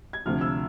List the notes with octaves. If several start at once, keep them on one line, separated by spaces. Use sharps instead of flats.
G#6
D2 C3 F3 F6
E6